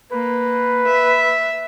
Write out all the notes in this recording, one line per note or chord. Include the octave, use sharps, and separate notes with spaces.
A#3 B4
E5